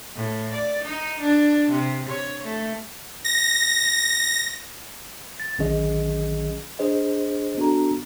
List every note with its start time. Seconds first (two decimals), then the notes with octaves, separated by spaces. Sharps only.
0.15 A2
0.53 D5
0.84 D#4
1.20 D4
1.71 C3
2.09 C#5
2.44 A3
3.25 A#6
5.40 A6
5.59 A#1 D#3 F#3 C#4 G#4 D#5
6.79 D4 G#4 C5 D#5
7.57 B3 D4 F#4 A4 A#5